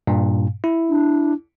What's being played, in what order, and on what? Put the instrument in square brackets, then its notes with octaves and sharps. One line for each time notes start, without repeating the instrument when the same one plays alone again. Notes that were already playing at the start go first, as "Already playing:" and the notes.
[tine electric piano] G2 A#2
E4
[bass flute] D4